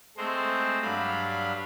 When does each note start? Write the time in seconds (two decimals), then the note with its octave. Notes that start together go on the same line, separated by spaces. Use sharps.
0.17 G#3 A3 C4 C5
0.82 G2 F#3 D4 F5 B5